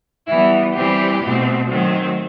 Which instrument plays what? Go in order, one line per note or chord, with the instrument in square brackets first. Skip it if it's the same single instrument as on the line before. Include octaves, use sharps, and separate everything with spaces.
[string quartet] E3 G3 B3 E4
E3 G3 C4 G4
B2 A3 C4
D#3 F#3 A3 C4